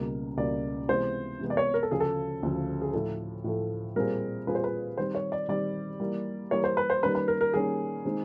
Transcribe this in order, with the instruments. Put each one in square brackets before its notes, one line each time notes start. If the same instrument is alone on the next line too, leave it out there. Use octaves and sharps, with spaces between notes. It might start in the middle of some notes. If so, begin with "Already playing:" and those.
Already playing: [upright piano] C#2 B2 G3 A#3
[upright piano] C#2 B2 G3 A#3 [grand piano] D5
[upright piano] C3 E3 G#3 B3 [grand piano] C5
[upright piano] C3 E3 G#3 B3
[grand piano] D5
C#5
A#4
A4
[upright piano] D2 C#3 F3 [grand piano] G#4
[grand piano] A4
[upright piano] D2 C#3 F3
[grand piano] G#4
[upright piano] A2 F3 A3 [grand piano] A4
[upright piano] A2 F3 A3
[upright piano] A#2 G3 C4 F4 G#4 [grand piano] A#4
[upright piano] A#2 G3 C4 F4 G#4 [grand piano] B4
[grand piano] C5
B4
[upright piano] D#3 G3 C4 [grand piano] C5
[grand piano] C#5
D5
[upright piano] D#3 G3 C4 [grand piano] D5
[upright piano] E3 G3 A#3
[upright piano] E3 G3 A#3 [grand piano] C#5
[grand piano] C5
B4
C5
[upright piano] D#3 G3 A#3 C#4 [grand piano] B4
[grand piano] B4
A#4
A#4
[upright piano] D#3 G3 A#3 C#4 [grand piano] G#4
[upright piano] D#3 G#3 C4 D#4